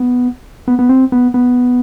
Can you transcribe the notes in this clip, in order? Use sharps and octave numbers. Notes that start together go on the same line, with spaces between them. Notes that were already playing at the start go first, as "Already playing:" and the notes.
Already playing: B3
B3
B3
C4
B3
B3